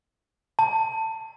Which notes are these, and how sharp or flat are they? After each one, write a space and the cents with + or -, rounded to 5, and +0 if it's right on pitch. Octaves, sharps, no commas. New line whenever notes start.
A5 +20